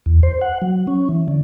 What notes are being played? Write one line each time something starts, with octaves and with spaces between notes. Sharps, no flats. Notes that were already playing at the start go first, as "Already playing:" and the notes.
E2
C5
F#5
F#3
C#4
E3
D3